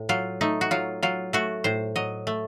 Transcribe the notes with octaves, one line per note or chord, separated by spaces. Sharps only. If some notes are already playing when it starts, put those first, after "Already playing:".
Already playing: A2
F#3 F4
A3 D#4
F#4
F#3 F4
F#3 F4
A3 F#4
A2 C5
F#3 D#5
A3